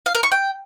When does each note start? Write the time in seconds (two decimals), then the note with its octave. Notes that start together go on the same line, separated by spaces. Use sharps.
0.06 F5
0.15 A#4
0.23 C#6
0.32 G5